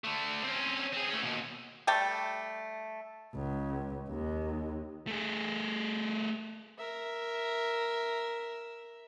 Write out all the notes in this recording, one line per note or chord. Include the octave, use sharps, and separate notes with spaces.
D3 A3
C4 C#4
C4 G#4
A3 C#4
D#2 B2
G3 A3 G5 A5
C#2
D#2
A3 G#4
A#4 E5